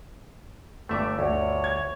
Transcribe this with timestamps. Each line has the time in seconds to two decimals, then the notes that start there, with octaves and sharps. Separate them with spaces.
0.89 G1 A3 G4 D5 E5 D6
1.19 D2 C#5
1.64 G#6